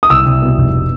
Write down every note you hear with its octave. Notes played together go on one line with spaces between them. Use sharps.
D#6
C2 E6
C2
B2
F1